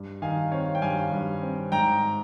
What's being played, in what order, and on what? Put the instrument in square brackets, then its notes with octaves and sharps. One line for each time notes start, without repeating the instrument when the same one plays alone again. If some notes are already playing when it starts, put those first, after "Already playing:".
Already playing: [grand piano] G2
D#3 F5 G#5
C4 C#5 F5
G5
G2 F5 G#5
G2
C4
G#2 G5 A#5